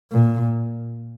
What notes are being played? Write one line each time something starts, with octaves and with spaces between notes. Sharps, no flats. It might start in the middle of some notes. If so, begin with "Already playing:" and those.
A#2